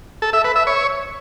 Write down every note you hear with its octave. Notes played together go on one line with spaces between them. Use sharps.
A4
E5
B4
E5
C#5